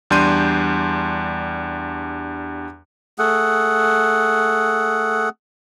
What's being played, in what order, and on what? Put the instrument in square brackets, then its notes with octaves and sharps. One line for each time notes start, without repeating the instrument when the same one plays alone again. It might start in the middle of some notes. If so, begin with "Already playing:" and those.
[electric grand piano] E2 G3 D4 C6 G6 D#7
[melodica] A3 G#4 F#5